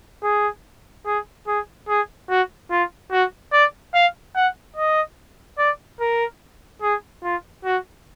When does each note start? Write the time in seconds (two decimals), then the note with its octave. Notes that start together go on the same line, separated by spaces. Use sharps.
0.23 G#4
1.06 G#4
1.47 G#4
1.89 G#4
2.30 F#4
2.71 F4
3.11 F#4
3.53 D5
3.94 F5
4.35 F#5
4.77 D#5
5.58 D5
6.00 A#4
6.82 G#4
7.23 F4
7.65 F#4